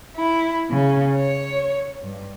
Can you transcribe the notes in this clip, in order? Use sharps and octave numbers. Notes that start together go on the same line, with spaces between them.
E4
C#3
C#5
G2